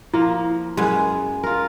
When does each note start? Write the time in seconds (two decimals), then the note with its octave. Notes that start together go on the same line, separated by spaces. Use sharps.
0.14 F3 A#3 E4
0.77 F#2 G#3 B3 G#5
1.44 F4 A#4